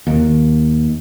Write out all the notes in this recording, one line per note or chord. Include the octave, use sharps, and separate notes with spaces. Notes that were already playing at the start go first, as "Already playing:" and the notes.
D#2